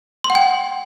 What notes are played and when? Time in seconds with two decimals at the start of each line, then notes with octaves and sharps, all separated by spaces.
0.24 C6
0.30 F#5
0.35 G5